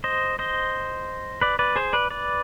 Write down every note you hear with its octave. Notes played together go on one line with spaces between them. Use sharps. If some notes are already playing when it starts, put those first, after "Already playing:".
C5 D#5
C5 D#5
B4 D5
B4 D5
G#4 C5
B4 D5
B4 D5